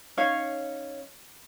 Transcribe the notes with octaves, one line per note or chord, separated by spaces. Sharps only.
C#4 D#4 C#5 F5